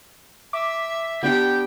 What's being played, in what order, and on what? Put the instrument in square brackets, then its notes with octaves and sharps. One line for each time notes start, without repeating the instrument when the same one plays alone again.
[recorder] E5 [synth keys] D6
[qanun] B3 D4 G4 [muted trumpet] G5